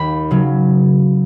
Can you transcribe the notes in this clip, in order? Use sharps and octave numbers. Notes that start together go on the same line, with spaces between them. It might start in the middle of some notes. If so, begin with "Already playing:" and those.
Already playing: D#2 B5
C#3 F#3